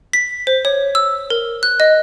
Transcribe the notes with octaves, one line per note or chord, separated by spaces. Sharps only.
B6
C5
C#5
E6
A#4
F#6
D#5